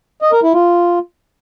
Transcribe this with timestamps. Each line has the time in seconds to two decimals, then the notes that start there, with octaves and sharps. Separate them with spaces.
0.22 D#5
0.32 A#4
0.43 E4
0.53 F4